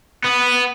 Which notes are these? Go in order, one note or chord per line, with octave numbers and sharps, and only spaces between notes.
B3